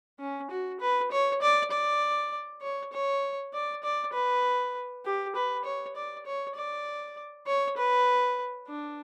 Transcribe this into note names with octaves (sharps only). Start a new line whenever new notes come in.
C#4
F#4
B4
C#5
D5
D5
C#5
C#5
D5
D5
B4
G4
B4
C#5
D5
C#5
D5
C#5
B4
D4